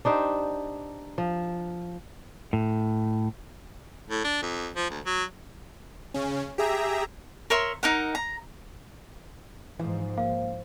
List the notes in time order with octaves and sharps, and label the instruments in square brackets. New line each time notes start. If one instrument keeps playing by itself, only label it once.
[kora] D4 D#4 G4 C5
F3
[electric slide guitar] A2
[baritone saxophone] A2
D4
F2
F3
D2
F#3
[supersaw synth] C#3 C#4
G4 G#4 E5 A#5
[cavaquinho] A#4 C#5 E5 C6
D#4 A#4 F#5
A#5
[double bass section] G#2 [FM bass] E3 [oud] F3
[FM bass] A#3 [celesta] F5